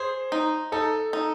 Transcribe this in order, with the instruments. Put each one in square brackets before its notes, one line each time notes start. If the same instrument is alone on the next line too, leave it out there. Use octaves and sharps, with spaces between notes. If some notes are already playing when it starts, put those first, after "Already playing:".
Already playing: [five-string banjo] G#4 [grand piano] C5
[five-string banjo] D#4
[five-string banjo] D#4 [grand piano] A4
[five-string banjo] D#4